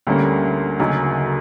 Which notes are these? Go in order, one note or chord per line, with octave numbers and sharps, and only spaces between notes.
D2 D3 G3 A#3 C#4
D2 C#3 F#3 A#3 D#4